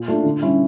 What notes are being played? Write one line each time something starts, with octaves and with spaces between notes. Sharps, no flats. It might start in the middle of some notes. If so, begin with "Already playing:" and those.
Already playing: A#2
A3 D4 F4
D3
G3 C#4 E4